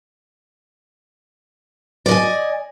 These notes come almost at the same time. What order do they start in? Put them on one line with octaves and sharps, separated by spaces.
D5 D#5 G#5